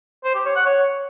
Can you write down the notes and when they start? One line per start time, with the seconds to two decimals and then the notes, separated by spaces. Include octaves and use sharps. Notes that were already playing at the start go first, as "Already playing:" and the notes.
0.24 C5
0.35 G4
0.45 C#5
0.56 F#5
0.66 C#5